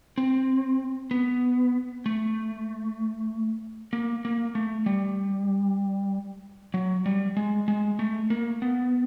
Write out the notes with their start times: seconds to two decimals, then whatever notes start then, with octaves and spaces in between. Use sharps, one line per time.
0.18 C4
1.11 B3
2.06 A3
3.93 A#3
4.25 A#3
4.55 A3
4.86 G3
6.74 F#3
7.06 G3
7.37 G#3
7.68 G#3
7.99 A3
8.30 A#3
8.62 B3